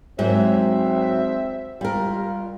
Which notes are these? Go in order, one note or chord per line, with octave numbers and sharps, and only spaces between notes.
G#2 F#3 A#3 C4 E5
G3 F4 A#4